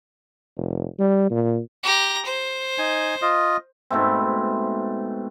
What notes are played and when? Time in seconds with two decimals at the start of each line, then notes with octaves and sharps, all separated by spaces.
0.57 F1
0.99 G3
1.31 A#2
1.83 G4 A#5
2.26 C5
2.78 D#4 G#5
3.22 F4 D#5
3.90 G#2 B2 A3 C4